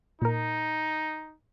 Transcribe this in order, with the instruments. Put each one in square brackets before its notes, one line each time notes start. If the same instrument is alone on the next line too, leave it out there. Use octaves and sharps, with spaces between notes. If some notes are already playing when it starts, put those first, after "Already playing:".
[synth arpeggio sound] A#2 A#4 [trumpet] D#4